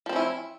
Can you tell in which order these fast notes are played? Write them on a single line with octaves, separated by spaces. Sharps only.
F3 C4 C#4 E4